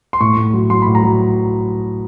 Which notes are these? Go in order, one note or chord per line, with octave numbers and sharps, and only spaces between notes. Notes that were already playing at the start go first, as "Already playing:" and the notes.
C6
A2 C#6
A2
F#3
F#3 C6
A2 B5
A#5
F#3